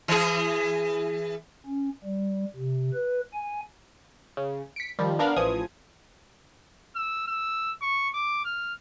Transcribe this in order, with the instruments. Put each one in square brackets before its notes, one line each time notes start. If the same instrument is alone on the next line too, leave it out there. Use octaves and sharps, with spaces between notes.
[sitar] E3 G#4
[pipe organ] C#4
G3
C3
B4
G#5
[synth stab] C#3
B6 C#7 D7
D#3 F3 G3
B3 D4 A#4 F5 B5
A1 E3 F3 D#6 G#6
[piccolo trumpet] E6
E6
C#6
D6
F6